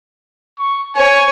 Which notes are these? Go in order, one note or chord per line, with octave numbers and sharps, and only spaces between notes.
C#6
C#5 G#5